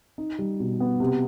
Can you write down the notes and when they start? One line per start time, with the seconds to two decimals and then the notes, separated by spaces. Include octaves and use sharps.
0.18 D#4
0.39 G3
0.60 B2
0.80 B3
1.00 C3